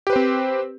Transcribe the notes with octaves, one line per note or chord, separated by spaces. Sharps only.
C4 G4 B4 C5